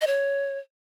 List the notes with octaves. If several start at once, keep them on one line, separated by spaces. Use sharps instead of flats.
D#5
C#5